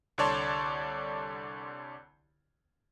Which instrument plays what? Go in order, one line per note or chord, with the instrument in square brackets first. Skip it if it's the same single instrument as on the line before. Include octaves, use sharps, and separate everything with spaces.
[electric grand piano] C2 D3 C#5 D5 A5 C6